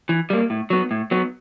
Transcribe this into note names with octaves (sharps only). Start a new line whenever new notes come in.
E3
G3 A#3
A2
F#3 B3
A2
F#3 B3